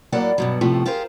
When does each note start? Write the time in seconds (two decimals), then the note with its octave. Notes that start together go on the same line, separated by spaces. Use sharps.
0.12 A2 F#3 A#3 A#4 D5 F#5
0.38 G2 B2 F#3
0.61 F2 A2 C3 F3 A3
0.86 F4 G4 G#4 A#4 C5